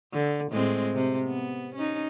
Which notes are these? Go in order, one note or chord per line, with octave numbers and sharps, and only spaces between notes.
D3
A2 G#3 C4
C3
B3
C#4 D#4